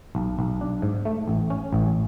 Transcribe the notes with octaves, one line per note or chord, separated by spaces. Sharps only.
B1
B1
D4
G#2
A3
A1
C#4
A1